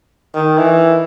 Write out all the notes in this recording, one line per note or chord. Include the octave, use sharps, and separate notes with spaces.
D#3
E3